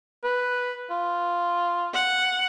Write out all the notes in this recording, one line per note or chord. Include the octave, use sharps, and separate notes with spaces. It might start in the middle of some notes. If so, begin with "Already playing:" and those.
B4
F4
F#5